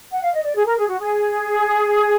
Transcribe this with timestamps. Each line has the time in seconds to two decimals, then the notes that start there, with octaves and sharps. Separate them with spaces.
0.12 F#5
0.23 F5
0.33 D#5
0.44 D5
0.55 G#4
0.66 A#4
0.77 G#4
0.88 F#4
0.99 G#4